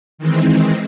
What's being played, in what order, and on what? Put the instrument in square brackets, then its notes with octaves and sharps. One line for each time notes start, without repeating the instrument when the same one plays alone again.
[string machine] D#3 E3 G#3 C4